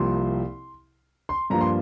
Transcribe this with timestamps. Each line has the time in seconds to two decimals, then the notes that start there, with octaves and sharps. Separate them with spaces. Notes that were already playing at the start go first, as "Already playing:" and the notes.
Already playing: C2 C3 F3 A#3 C6
1.29 C6
1.50 G2 F3 A#3 A#5
1.61 C6